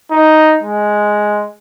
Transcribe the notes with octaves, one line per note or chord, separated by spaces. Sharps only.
D#4
G#3